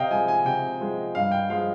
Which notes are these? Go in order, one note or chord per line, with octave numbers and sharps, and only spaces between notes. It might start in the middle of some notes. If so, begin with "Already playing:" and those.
Already playing: C3 D#5 F5 G5
F3 G#3 G#5
G#5
C3 G5
F3 G#3
G2 F5
G5
F3 G#3 F5